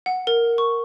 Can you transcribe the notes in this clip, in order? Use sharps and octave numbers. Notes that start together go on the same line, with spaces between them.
F#5
A#4
C#6